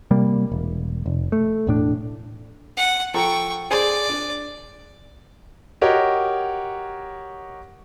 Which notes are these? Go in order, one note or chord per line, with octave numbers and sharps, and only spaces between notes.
C3 G3 A#3
E1
F1
A3
E1 A2 D4
F#5
F3 A4 G5 A#5 C#6
G#4 C5 D5 G#5
D4
F#4 G4 A#4 C#5 D#5